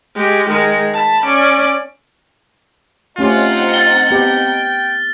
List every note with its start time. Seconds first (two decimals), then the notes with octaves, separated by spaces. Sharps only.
0.15 G#3 G4
0.49 D#3 G#3
0.94 A5 B5
1.25 C#4 D5
3.18 A3 C4 C#4 D#4 F4 G4 F#5
3.74 F6 A6 G7
4.11 B3 G4 G5